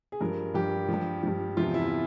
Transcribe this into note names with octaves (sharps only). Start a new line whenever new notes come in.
G#4
G2 F3 A#4
G2 F3 G4
F3
G2
G2 F3
E2 C3 F3 F4
E4